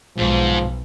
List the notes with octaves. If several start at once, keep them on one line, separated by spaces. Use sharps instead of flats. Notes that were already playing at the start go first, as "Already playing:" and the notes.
B1 G#2 F3